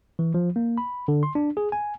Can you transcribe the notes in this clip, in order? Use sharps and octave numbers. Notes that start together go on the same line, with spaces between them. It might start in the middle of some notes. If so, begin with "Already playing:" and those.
E3
F3
A#3
B5
D3
C6
D4
G#4
G#5